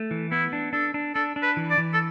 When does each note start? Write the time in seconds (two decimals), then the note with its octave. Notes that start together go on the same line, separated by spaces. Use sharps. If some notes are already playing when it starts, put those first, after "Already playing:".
Already playing: A3
0.11 E3
0.32 B3 E4
0.53 D4
0.73 D4 A4
0.94 D4
1.14 D4 A4
1.36 D4
1.43 B4
1.57 E3
1.70 D5
1.78 E3
1.93 A4